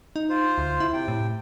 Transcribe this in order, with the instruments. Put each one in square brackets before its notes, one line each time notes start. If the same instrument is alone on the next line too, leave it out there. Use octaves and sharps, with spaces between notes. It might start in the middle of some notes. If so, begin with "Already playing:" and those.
[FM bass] D#4
[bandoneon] F4 C5
[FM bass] D2
E4
[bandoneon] C3 G5
[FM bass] A2